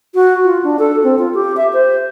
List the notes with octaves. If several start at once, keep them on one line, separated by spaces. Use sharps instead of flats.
F#4
F4
D4
A4
C4
F4
G4
E5
C5